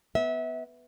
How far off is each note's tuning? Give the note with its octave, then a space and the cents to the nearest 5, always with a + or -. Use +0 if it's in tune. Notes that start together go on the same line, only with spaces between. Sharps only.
B3 +0 E5 -30